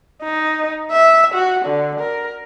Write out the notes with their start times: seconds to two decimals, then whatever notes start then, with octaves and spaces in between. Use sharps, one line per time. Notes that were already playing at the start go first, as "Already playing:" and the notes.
0.23 D#4
0.91 E5
1.35 F#4
1.66 D3
2.00 A#4